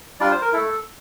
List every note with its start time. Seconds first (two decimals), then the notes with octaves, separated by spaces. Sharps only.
0.20 G3 D4 F4 D5
0.31 C5
0.42 A#4
0.53 A3 E4 A4